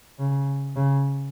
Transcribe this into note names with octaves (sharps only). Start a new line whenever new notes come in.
C#3
C#3